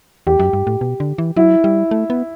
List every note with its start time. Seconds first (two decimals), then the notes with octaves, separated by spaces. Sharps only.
0.27 E2 G4
0.39 F#2
0.53 G2
0.67 A2
0.81 B2
1.00 D3
1.18 E3
1.36 F#3 E4
1.64 G3
1.91 A3
2.10 B3